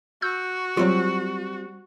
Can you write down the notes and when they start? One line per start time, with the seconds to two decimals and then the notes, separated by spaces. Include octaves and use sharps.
0.22 F#4 E6 G6
0.77 F#3 G3 C4 F4